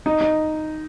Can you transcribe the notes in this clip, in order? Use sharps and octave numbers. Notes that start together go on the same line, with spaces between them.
D#4
D#4